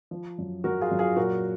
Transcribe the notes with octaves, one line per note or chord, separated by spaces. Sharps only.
F3
F#2
F#2 F#4 A#4
F4 G#4
F#2
F4 G#4
A#2 F#4 A#4